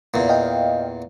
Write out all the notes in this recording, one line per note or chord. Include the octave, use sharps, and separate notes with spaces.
E2 A#2
D#5 F5 G5